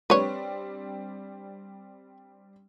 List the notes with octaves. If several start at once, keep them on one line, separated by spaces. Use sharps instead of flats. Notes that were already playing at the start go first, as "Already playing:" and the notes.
G3 C4 D4 B4 C#5